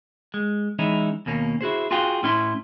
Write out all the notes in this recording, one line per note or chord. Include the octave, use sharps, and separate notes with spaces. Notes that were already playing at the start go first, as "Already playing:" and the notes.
G#3
E3 G#3 C#4 D#4 E4
D#2 B2 A#3 C#4
E4 F#4 G#4 C5
F4 F#4 G#4 F5 G5
A2 C#4 E4 C6